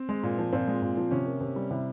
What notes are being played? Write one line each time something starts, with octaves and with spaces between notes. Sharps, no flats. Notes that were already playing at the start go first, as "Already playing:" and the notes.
Already playing: C4
G#3
A#2
F3
A#2 C4
G#3
A#2
F3
C3 C#4
A#3
C3
G3
C3 E4